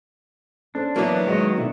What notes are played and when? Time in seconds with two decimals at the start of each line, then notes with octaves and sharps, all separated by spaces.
0.75 C#4 D4 A4 C5
0.96 E3 F#3 A#3 B3 E4
1.27 D#3 G#3 F#4 D#5
1.57 B2 D3 E4